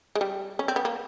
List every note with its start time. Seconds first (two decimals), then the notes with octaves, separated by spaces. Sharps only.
0.15 G#3
0.21 G3
0.59 C#4
0.68 C4
0.76 B3
0.85 A#3